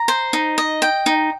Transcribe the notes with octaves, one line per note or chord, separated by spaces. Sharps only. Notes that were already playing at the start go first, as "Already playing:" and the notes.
Already playing: A#5
C5
D#4
D#5
G5
D#4